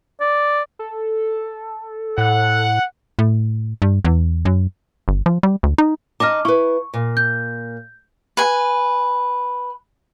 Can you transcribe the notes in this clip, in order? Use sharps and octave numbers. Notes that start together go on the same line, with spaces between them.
D5
A4
A2 F#5
A2
G2
E2
F#2
G1
F3
G3
D2
D#4
D#4 D#5 A5 D6 F6
E4 B4 C#6
A#2
G6
B4 G#5